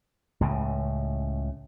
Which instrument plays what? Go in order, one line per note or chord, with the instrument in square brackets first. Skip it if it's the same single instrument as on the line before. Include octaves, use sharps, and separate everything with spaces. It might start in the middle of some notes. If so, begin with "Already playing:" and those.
[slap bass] C#2 A2 C#3